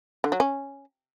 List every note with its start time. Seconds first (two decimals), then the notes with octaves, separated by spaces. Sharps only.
0.24 D3
0.32 F#3
0.40 C#4